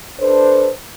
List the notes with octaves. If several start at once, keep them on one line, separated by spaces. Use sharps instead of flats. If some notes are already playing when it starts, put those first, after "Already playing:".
D4 A4 B4 C5